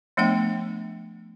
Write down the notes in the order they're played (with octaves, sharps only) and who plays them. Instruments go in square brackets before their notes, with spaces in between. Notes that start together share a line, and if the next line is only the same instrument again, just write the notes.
[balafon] F3 A3 B3 D4 F#5 G5